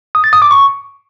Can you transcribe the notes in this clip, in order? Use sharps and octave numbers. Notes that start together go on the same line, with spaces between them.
D#6
A6
D#6
D6
C#6